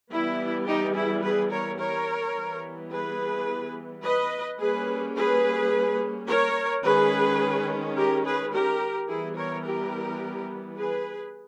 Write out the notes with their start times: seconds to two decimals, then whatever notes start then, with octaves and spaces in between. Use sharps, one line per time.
0.11 E3 G3 B3 E4
0.67 D#4 G4
0.95 E4 G#4
1.23 G#4 B4
1.51 A#4 C#5
1.79 A#4 C#5
2.35 E3 G3 B3
2.91 G#4 B4
4.04 B4 D#5
4.60 G3 A#3 C#4 G#4 B4
5.16 G#4 B4
6.28 A#4 C#5
6.84 D#3 G#3 C#4 G#4 B4
7.96 G4 A#4
8.25 G#4 B4
8.53 G4 A#4
9.09 E3 G3 B3 E4 G#4
9.37 A#4 C#5
9.65 G4 A#4
10.77 G#4 B4